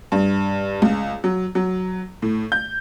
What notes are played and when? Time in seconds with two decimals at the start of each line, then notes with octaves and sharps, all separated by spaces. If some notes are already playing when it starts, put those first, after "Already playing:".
0.12 G2
0.82 C#2
1.24 F#3
1.55 F#3
2.22 A2
2.52 G6